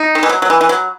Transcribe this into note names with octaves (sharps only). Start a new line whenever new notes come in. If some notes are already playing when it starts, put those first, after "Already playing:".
Already playing: D#4
D#3
E3
F#3
F#3
E3
E3
F#3